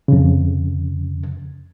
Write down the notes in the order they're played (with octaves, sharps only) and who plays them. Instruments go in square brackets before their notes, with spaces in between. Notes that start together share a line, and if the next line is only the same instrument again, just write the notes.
[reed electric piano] F2 C#3